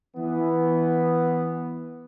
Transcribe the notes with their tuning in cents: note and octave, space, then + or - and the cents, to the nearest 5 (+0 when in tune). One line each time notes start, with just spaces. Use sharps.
E3 +0 B3 +0